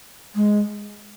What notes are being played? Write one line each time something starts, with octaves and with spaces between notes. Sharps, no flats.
G#3